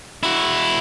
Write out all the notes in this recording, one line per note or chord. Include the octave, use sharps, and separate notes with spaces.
E4 F#4